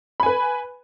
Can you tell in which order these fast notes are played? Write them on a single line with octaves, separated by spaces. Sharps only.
B5 G#5 B4